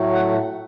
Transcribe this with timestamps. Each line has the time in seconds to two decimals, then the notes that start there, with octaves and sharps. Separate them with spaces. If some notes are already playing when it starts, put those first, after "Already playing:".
Already playing: A2 F#3 A3
0.14 F#5